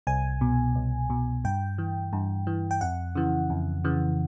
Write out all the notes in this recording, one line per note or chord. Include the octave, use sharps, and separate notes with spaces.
C2 G#5
B2
C2
B2
G2 G5
E3
G2
E3
G5
F2 F#5
C#3 E3
F2
C#3 E3